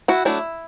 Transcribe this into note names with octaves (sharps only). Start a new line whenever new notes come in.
E4 F#4
F#3 A3 D4 E4